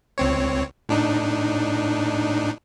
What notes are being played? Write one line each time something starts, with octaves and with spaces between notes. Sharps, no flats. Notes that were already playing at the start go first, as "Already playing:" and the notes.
C#2 C4 C#5
A2 D4 D#4